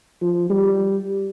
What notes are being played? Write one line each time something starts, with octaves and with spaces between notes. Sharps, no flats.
F3
G3